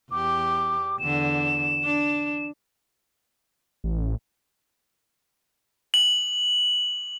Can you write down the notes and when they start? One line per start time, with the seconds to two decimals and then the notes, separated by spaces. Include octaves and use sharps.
0.11 E2 G4 D6
0.99 E2 D3 E7
1.84 D4
3.84 A1
5.94 F#7